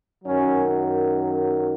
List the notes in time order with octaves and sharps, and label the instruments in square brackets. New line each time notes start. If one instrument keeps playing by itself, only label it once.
[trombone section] F#2 D#3 F#3 C#4